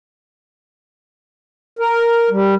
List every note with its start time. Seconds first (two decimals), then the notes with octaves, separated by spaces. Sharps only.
1.79 A#4
2.31 G3